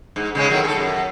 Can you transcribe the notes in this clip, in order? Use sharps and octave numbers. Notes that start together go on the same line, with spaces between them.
G#2
C#3 G#3 C#4
A2 D#3 F#3
G#4 A4
F#2